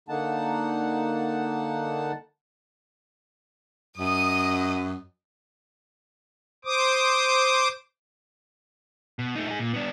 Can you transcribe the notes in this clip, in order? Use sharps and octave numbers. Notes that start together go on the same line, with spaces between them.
D3 A#3 D#4 F#5 A5
F#2 D#5 D#6
C5 D6 D#6
B2
A3 D#4
D#4 G#4
A#2
B3 D4